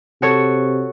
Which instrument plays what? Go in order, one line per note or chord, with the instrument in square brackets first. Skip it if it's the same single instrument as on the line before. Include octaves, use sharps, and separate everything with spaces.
[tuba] C3 [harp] F#4 A4 C#5